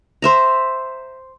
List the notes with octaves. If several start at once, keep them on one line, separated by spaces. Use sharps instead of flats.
C5 E5 A#5